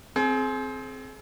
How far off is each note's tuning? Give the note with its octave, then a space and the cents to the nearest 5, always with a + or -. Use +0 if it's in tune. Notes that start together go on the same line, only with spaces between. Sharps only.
C4 +0 G#4 +35